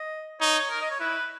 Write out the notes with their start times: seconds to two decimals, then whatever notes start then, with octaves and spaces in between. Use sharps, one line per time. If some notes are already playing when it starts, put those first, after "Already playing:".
Already playing: D#5
0.41 D#4 C#5
0.70 A#4
0.81 D#5
0.91 C#5
1.00 E4 B4